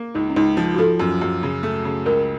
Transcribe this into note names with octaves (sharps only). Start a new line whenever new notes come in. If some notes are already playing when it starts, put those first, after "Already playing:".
Already playing: A#3
C#2 D#4
C#4
C#2 D#4
F3 F4
F#4
F3 A4
F#2
F#2
C#3
A3
C#3
C#2 A#4